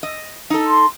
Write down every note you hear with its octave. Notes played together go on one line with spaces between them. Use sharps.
D#5
D#4 A4
C6